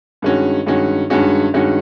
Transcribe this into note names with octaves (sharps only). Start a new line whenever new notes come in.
G2 D#3 G#3 C#4 F#4
G2 D#3 G#3 C#4 F#4
G2 D#3 G#3 C#4 F#4
G2 D#3 G#3 C#4 F#4